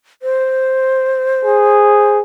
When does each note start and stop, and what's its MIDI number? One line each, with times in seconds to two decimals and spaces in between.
0.22 2.17 72
1.45 2.22 68